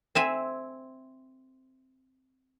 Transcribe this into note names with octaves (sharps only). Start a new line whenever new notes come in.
C4 E5 G#5